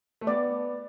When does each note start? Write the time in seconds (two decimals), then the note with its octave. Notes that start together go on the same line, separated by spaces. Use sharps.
0.21 A3
0.27 B3 D5